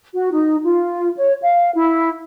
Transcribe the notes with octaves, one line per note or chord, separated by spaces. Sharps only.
F#4
D#4
F4
C#5
F5
E4